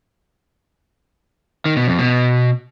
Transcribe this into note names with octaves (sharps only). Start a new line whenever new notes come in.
D#3
B2
F2
B2